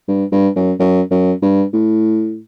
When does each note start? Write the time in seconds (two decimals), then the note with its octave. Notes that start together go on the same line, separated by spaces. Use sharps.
0.08 G2
0.32 G2
0.56 F#2
0.80 F#2
1.10 F#2
1.42 G2
1.74 A2